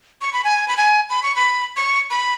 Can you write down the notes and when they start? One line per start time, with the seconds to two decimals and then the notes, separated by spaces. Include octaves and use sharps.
0.21 C#6
0.33 B5
0.44 G#5
0.68 B5
0.77 G#5
1.10 B5
1.23 C#6
1.36 B5
1.76 C#6
2.10 B5